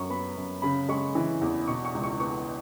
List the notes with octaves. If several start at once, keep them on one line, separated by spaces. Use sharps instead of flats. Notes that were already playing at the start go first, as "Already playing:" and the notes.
Already playing: F#2 F#3 C#6
B3 B5
F#2
C#3 B5
G#3 C#6
E3
E2
B2 C#6
C#6
C#2
C#6
B3 C#6